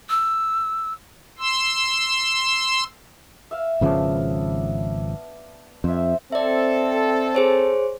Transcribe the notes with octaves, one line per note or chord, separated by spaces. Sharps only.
E6
C6 E6
E5 F5
G#1 C#3 F3 B3 D4
F2 C5 E5
C4 A4 D5 E5
G#4 C5 C#5